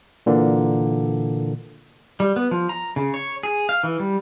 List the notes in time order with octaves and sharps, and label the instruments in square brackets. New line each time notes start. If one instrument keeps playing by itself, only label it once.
[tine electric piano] A#2 D3 E3 A#3
[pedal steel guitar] G3
B3
F3
A#5
C#3
C#5
G#4
F5
E3
G3